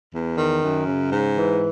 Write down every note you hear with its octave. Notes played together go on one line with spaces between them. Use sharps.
E2
D#3
F#2
C#3
G#2
E3